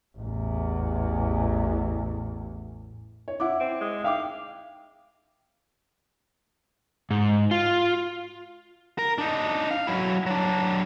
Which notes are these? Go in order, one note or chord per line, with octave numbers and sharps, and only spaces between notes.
A1 E2
C#5
E4 F#5 D6
C4
G#3
E5 F5 G5 D6
G#2
F4
A#4
D4 D#4
F5
F#3 E4
F#3 D4